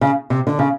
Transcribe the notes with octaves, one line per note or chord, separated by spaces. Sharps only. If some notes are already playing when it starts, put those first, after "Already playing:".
C#3
C3
D3
C#3